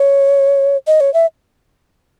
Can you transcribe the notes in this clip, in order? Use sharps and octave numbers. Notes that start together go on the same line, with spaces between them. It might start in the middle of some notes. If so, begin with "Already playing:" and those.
Already playing: C#5
D#5
C#5
E5